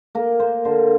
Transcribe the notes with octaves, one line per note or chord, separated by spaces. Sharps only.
A#3 A#4
A#3 C5
D3 C5